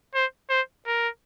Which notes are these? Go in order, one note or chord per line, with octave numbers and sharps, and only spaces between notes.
C5
C5
A#4